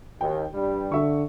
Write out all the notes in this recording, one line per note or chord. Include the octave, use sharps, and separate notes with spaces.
D#2 G5
G2 G3
D3 E5 C#6